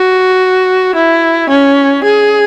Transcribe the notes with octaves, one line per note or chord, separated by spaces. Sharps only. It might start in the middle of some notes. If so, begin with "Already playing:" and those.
Already playing: F#4
E4
C#4
G#4